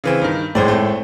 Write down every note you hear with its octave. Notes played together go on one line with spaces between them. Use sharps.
C#3 E3 C4
G2 D#3
G#1 A2 G#3 C5 D5
A3 C4